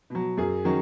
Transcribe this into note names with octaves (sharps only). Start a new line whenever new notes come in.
B2 F#3
F#2 G#4
D#3 F#3 C#4